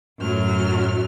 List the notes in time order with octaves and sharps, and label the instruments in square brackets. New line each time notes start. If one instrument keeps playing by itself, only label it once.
[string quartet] F#2 A2 F#3 F6